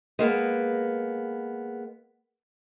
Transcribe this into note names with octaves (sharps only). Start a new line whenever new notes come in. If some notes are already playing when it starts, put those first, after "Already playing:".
G#3 A#3 B3